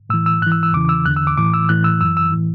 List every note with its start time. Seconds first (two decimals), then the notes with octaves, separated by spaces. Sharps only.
0.10 A2 E3 E6
0.26 E6
0.42 G#2 F#6
0.46 E3
0.52 E6
0.63 E6
0.73 E2 C#3 E3 D6
0.89 E6
1.06 E2 D3 F#6
1.16 E6
1.27 D6
1.37 A2 E3 D6
1.54 E6
1.69 A2 E3 F#6
1.84 E6
2.00 F#2 E3 E6
2.17 E6
2.32 A2 E3